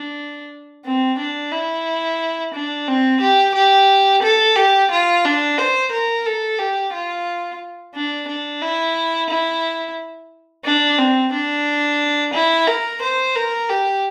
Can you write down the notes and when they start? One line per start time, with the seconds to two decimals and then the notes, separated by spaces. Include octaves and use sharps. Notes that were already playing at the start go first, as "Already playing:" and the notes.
Already playing: D4
0.85 C4
1.19 D4
1.52 E4
2.54 D4
2.87 C4
3.21 G4
3.55 G4
4.22 A4
4.56 G4
4.91 F4
5.25 D4
5.58 C5
5.92 A#4
6.26 A4
6.59 G4
6.93 F4
7.94 D4
8.28 D4
8.62 E4
9.30 E4
10.65 D4
10.98 C4
11.33 D4
12.33 E4
12.67 A#4
13.02 C5
13.35 A#4
13.69 G4